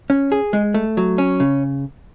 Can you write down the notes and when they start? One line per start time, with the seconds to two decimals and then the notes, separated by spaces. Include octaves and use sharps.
0.10 C#4
0.32 G#4
0.53 G#3
0.74 A3
0.97 F#3
1.18 C#4
1.40 C#3